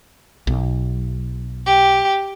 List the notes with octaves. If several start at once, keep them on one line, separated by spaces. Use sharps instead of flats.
B1
G4